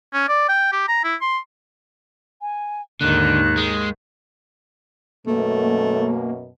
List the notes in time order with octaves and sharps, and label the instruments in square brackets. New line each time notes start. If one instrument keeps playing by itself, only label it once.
[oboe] C#4
D5
G5
G4
A#5
E4
C6
[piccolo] G#5
[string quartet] D#2 G#2 D#3 [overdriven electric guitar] D3 [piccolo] F#6
[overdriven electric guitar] G#3
[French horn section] F#2 B2 [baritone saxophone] A3 [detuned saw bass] A#3